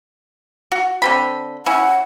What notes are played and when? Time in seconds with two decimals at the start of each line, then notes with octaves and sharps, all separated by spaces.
0.72 F#4
1.02 D3 C4 B5
1.66 C#4 E4 F#5